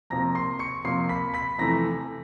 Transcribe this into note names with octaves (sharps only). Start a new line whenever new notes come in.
F2 C3 F3 A#3 A#5 A#6
C6 C7
C#6 C#7
F2 C3 F3 A#3 C6 C7
B5 B6
B5 B6
F2 C3 E3 A3 A#5 A#6